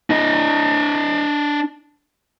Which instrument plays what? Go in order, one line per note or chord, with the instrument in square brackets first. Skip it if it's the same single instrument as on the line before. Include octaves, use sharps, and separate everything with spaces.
[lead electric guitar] D4 D#5